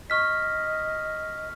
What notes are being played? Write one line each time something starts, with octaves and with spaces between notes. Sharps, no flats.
D#5 C#6 F6 B6